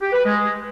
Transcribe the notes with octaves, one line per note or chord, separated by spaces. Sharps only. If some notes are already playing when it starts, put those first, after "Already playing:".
G4
B4
G#3